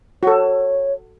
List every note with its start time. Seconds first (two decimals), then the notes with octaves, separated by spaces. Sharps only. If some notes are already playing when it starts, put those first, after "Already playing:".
0.23 F#4 A4 C#5